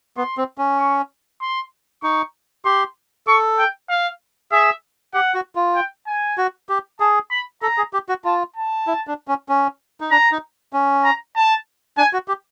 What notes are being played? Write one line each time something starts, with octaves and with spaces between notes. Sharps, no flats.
B3 C6
C4
C#4
C#6
C6
D#4 C#6
G4 C6
A4 C#6
G5
F5
G#4 E5
G4 F#5
F#4
F4
G5
G#5
F#4
G4
G#4 A5
B5
A4 A#5
G#4
G4
F#4
F4 A5
A5
E4
D4
C#4
C#4
D#4
D4 A#5
D#4
C#4
A#5
A5
D4 G#5
F#4
G4